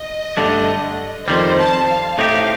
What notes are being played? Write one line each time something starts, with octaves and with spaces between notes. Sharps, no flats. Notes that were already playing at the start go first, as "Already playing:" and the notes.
Already playing: D#5
G2 D3 A3 D4
F2 D#3 G3 C5
A5
F5
A2 A3 C4 D#4 G4